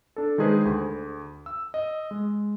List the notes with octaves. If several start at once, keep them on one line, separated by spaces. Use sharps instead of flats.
D4 A4
D#3 G#3 D#4 G#4 B4 C5
D2
E6
D#5
G#3